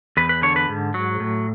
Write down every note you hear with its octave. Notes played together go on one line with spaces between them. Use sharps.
E2 B4
B4
D3 C#5
B4
G#2
F#3
A2